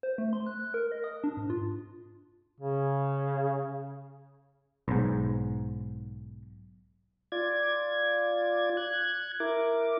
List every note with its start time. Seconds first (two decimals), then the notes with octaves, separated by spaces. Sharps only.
0.03 C5
0.18 A3
0.33 C6
0.46 F#6
0.60 F#6
0.74 A#4
0.92 D#5
1.04 D#6
1.24 D4
1.37 G#2
1.50 F4
2.60 C#3
4.88 B1 G#2
7.32 F4 D5 G#6
8.77 F#6 G#6
9.40 E4 A#4 D6